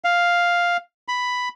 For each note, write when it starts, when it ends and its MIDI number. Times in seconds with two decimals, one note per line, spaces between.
0.04 0.77 77
1.08 1.49 83